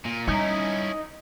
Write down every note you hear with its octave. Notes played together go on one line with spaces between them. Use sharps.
A#2
G3 C#4 D#4 E4